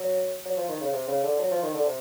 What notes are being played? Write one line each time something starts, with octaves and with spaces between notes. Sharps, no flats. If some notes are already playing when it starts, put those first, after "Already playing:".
Already playing: F#3
F#3
F3
D#3
C#3
C3
C#3
D3
F#3
F3
D#3
D3
C3